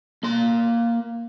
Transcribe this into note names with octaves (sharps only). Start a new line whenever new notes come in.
A#3 C6